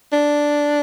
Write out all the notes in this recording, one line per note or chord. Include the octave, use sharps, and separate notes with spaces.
D4